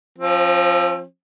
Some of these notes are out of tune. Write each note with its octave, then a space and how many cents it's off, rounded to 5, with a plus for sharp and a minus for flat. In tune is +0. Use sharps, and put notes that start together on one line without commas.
F3 +0 C4 +40